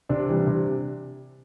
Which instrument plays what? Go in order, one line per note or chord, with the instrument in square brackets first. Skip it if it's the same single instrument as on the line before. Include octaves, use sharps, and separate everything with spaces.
[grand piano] C3 D4
E3 G3
C3